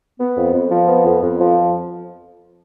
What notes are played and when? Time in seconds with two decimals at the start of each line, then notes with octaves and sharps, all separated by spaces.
0.19 B3
0.37 F2
0.53 F2
0.70 F3
0.88 B3
1.04 F2
1.22 F2
1.39 F3